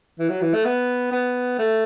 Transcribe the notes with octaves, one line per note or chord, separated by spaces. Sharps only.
E3
F#3
E3
A3
B3
B3
A3